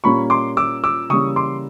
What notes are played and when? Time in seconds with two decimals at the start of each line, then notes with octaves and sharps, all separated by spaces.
0.04 A#2 G3 A#3 C#4 B5 C#6
0.30 C6 D6
0.57 D6 E6
0.84 D6 E6
1.09 C#3 E3 G3 A#3 C#4 C#6 D#6
1.36 C6 D6